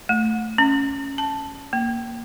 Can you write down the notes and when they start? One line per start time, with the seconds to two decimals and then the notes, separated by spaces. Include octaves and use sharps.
0.09 A3
0.58 C#4
1.18 A5
1.73 A#3